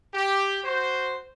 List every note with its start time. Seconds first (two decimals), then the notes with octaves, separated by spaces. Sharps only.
0.13 G4
0.63 F#4 C5